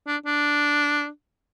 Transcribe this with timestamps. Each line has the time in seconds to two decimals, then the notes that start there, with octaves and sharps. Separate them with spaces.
0.07 D4
0.26 D4